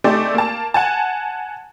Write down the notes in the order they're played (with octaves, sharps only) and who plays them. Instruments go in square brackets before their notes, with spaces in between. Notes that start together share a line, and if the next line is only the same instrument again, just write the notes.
[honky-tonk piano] A3 C4 D#4 G4 G#4 D5
A#3 A5
F#5 G#5 A5